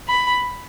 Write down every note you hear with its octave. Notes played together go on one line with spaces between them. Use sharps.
B5